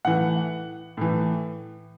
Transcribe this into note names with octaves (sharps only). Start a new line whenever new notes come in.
A2 E3 F#5
A2 E3